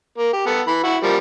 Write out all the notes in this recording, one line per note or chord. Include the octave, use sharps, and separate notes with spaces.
A#3
G4
B3 A4
E3 B5
E4 F#4
F3 G3 A#3